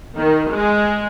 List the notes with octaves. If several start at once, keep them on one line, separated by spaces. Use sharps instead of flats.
D#3
G#3